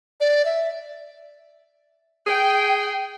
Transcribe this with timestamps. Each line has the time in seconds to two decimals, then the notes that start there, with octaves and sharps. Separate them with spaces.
0.20 D5
0.45 E5
2.26 G#4 G5